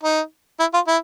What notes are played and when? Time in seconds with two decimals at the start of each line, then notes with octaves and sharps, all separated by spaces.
0.03 D#4
0.60 E4
0.74 F4
0.88 E4